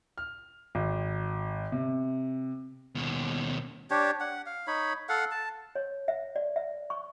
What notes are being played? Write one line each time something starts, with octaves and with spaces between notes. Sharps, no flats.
F6
G#1
C3
D#2 B2
D4 G4 C#5
F#5
F5
D#4 C#5 B5
A4 F5 F#5
A5
C#5
E5
D5
E5
C#6